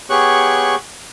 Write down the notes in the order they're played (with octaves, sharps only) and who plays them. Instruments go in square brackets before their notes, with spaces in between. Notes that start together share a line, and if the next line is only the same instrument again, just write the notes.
[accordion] B3 G4 G#4 C#5 C#6 F#6